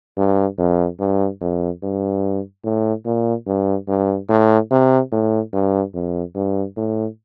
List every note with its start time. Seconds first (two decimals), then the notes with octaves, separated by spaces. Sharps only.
0.18 G2
0.58 F2
1.00 G2
1.41 F2
1.83 G2
2.64 A2
3.05 A#2
3.47 G2
3.88 G2
4.30 A2
4.71 C3
5.12 A2
5.53 G2
5.94 F2
6.35 G2
6.77 A2